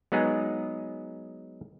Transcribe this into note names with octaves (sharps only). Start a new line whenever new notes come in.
F#3 G#3 B3 D#4 G#4